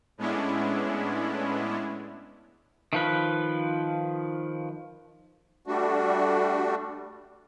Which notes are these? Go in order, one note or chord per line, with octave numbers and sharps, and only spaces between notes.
A2 G#3 B3 C#4 D4 E4
D#3 F3 B4
G3 A3 D4 F#4